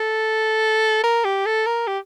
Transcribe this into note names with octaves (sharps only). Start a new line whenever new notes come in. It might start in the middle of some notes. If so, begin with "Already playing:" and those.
Already playing: A4
A#4
G4
A4
A#4
G4